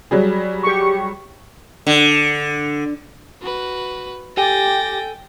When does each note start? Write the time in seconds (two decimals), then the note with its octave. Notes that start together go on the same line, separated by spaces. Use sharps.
0.11 F#3 G3 G#4
0.63 G4 C#6
1.87 D3
3.41 F#4 B4
4.37 G4 A4 G5 G#5 A6 A#6